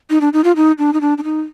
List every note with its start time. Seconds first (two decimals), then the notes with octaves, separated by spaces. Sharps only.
0.10 D#4
0.21 D4
0.33 D#4
0.44 F4
0.56 D#4
0.78 D4
0.93 D#4
1.01 D4
1.18 D4
1.24 D#4